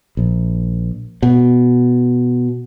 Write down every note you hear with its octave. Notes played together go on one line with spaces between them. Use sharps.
A#1
B2